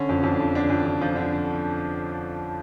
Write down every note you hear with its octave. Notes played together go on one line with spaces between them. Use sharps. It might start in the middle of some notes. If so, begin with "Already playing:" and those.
Already playing: D3 C#4
F2
F2 D4
F3
D3 D4
F2
F2
F3
D3 D4